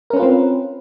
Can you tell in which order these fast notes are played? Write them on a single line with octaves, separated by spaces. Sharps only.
A#4 C#4 B4 F4 C4